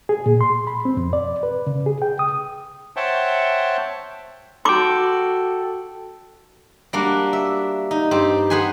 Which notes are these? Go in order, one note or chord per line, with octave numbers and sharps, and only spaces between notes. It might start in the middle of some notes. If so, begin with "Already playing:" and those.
G#4
A#2
C6
B5
C4
F2
D5
B4
C#3
G#4
G5
D#6
C5 C#5 E5 F#5 G5 A5
F#4 A4 G5 C6 D6
G3 A#3 D4 F#4
E5
D#4
G2 C4 G4
B3 G#4 B4 C5 G#5